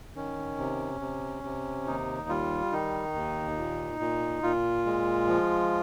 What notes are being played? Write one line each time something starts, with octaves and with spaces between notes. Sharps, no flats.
D#3 C#4
C3
C3
C3
D#2 D#4
G3 F4
D#3 D#4
D#2
A#2
A#2
A#2 F4
G#3
F3